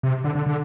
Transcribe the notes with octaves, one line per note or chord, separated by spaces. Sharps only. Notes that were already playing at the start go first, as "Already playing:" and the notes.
C3
D3
D3
D3